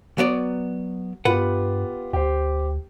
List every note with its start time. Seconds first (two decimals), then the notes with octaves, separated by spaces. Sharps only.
0.18 F#3 B3 D5
1.25 G2 B3 F4 G4 B4 F#5
2.13 D2 G4 C5